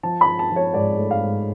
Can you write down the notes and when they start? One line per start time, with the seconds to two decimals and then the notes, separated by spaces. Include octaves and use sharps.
0.03 F3 A5
0.21 B5
0.26 F3
0.39 A5
0.51 F3
0.56 C#5
0.74 G#2 D5
0.98 A3
1.11 F5
1.22 G#2